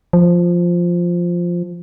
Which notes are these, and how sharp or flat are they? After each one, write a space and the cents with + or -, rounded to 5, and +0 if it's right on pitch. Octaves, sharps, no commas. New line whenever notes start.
F3 +0